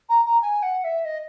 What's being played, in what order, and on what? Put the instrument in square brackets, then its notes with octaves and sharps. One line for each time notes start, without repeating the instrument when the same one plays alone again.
[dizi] A#5
A#5
G#5
F#5
E5
D#5